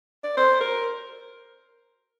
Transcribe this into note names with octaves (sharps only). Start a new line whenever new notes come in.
D5
C5
A#4